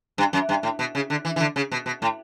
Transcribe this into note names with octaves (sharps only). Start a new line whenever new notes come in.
G2
F#2
G2
A2
B2
C#3
D3
E3
E3
D3
C#3
B2
B2
A2